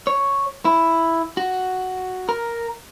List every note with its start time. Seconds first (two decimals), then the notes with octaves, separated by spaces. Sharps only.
0.07 C#5
0.65 E4
1.37 F#4
2.29 A#4